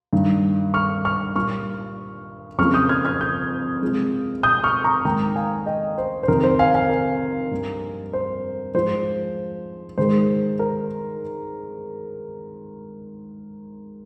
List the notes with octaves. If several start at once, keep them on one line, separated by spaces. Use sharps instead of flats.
G2 D#3 A#3
C#6 F6
C#6 F6
A#2 G3 A#3 C#6 F6
F2 C#3 F3 A#3 C#6 F6
D#6 G6
F6 G#6
F6 G#6
D#6 G6
C3 F3 G#3
D#6 G6
C#6 F6
A#5 C#6
G#2 D#3 A#3 G5 A#5
F5 G#5
D#5 G5
C5
C5
F2 C3 D#3 A#4
C5
F5 G#5
F5 G#5
A#4
G2 G3 A#3
C5
G#2 F3 G#3 C5
G#2 D#3 G#3 C5
A#4